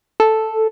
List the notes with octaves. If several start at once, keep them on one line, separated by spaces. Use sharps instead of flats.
A4